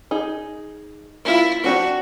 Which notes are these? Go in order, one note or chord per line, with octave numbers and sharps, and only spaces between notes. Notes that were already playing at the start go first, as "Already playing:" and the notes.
D#4 G#4
A#3 E4 F4
C4 D4 F#4 G4